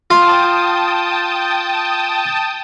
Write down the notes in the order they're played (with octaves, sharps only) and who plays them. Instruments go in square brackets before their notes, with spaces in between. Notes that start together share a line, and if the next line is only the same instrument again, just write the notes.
[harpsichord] F4 [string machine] G5 A5 D#6